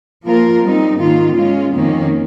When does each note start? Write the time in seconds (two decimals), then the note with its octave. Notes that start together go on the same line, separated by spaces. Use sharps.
0.25 F3 A#3 F4 A#4
0.62 G3 C4 D#4
0.99 G#2 D#3 A#3 F4
1.37 G#3 C#4 F4
1.74 F2 D#3 A#3 C#4